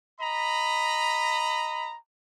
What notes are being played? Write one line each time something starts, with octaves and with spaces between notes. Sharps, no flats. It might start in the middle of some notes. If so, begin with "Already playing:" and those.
D#5 A#5 B5